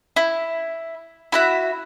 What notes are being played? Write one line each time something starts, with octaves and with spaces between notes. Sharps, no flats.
E4
E4 F#4 E5